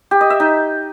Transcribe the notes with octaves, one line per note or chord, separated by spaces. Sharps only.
G4
D#5
E5
D#4